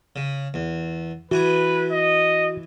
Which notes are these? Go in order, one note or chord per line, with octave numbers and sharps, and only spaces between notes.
C#3
E2
E3 F#4 B4 G#5 A#5
D#5